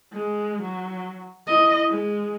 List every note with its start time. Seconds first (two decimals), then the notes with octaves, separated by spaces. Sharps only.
0.13 G#3
0.63 F#3
1.48 E4 D#5
1.90 G#3